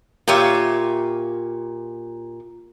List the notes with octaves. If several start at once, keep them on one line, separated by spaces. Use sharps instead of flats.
A#2 F4 G4 C#5 E5